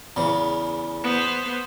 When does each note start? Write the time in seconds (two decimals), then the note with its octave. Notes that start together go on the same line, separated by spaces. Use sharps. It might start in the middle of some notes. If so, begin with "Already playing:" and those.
0.16 E2 C#3
1.04 B3 C5